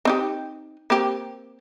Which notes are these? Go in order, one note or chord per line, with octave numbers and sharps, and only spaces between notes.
C4 D#4 G4
A#3 C4 G4